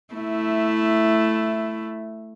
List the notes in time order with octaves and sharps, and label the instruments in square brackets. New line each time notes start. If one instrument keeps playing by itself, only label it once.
[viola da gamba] A3 E4